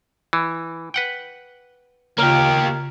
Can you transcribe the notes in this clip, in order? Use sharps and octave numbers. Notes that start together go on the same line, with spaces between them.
E3
B4 F#5 G5
C#3 A#3 F4 G4 A#5 F6